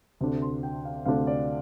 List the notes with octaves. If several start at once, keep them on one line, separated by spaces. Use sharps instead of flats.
D2 C3 A3 D4
C6
G5
F5
D2 C3 A3 D4 F5
D5